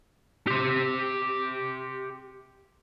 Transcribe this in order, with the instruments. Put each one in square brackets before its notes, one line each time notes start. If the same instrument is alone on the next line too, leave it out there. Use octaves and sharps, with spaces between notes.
[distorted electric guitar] G4 C6